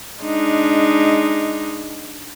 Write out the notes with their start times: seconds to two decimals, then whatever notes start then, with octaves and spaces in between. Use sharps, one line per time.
0.21 G#3 D4 D#4